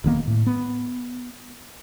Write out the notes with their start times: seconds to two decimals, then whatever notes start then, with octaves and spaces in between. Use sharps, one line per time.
0.04 D#1 D#3 A#3 B3
0.27 A2
0.47 B3